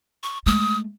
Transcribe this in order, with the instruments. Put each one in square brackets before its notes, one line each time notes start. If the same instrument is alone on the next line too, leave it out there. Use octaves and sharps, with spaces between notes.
[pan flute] C#6
[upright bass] G#3 A3 [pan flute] D#6